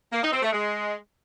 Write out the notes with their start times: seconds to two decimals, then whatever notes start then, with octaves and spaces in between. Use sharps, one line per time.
0.12 A#3
0.22 D#4
0.32 C4
0.42 A3
0.52 G#3